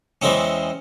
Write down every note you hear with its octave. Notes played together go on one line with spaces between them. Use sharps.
E2 E3 G#3 C4 C#4